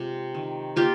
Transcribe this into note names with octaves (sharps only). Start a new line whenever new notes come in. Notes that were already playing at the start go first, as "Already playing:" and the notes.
Already playing: C3 G#3 F4
D#3
A#3 F4 G4